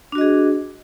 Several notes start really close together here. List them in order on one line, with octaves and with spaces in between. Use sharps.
D4 F#4 D#5 G#4